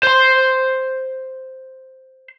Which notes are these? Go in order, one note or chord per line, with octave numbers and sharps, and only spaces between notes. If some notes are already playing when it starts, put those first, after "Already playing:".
C5 C6